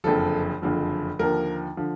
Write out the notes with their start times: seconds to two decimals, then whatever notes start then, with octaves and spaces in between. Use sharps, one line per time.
0.04 F#1 F2 D3 F3 A4
0.62 F#1 F2 D3 F3
1.19 D#2 D3 F3 A#4
1.77 D3 F3